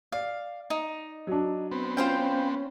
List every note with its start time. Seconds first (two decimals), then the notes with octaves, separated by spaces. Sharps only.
0.12 D5 F5
0.70 D#4
1.27 F#3 D4
1.72 B3 C4
1.97 C#4 F4 C5 G5